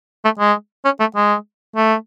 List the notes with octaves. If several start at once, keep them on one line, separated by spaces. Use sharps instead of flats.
A3
G#3
C#4
A3
G#3
A3